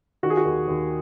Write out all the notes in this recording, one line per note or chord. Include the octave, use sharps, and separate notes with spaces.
D#3 F#4
G#4
F#4
D#2
D#2